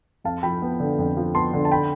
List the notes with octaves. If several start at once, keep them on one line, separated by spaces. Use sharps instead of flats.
F2 F5 A5
F3 G5 B5
B3
D3
F2
F3
B3 A5 C6
D3
A5
G5 B5